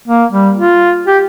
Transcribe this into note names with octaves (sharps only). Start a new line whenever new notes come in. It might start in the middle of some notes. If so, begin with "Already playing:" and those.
A#3
G3
F4
G4